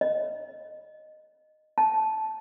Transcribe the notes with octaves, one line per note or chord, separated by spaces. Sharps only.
D#5
A5